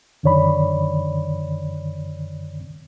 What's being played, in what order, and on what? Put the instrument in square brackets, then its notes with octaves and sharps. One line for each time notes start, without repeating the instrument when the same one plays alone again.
[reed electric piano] F#2 D3 D#3 C#5 D5 B5